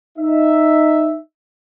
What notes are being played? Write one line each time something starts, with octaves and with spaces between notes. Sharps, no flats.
D#4 E5